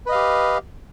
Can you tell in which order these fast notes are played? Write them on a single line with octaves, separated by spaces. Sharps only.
B4 D#5 F5 G4